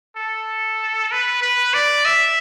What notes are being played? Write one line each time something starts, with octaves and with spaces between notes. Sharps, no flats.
A4
B4
B4
D5
E5